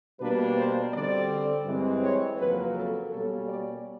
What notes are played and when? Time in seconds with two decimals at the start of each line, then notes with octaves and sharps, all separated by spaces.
0.20 B2 G3 A#3 D4 B4
0.56 C5
0.93 D3 G3 C4 D5
1.66 G2 E3 G#3 C4
2.02 C#5
2.38 F2 C#3 F#3 A#3 B4
2.74 A4
3.10 B2 G3 A#3 C#4 A4
3.47 D5